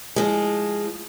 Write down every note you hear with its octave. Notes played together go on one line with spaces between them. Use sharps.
F3 G#3